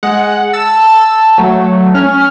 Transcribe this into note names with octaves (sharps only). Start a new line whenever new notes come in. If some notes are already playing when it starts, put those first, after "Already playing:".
G#3 F#5
A5 E6
F#3 A3
C#4 F6